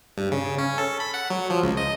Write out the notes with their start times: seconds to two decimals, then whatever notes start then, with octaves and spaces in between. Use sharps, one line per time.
0.18 G2
0.32 C#3
0.58 C#4
0.78 A4
1.00 B5
1.14 F#5
1.30 F#3
1.50 F3
1.63 C#2
1.77 D#5